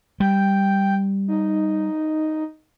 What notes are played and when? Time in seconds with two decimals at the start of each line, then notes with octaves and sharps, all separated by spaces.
0.20 G3 G5
1.28 D#4